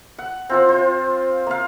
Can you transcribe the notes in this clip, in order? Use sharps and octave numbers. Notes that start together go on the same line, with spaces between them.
F#5
C4 F4 C5
F4 C5
A#3 F5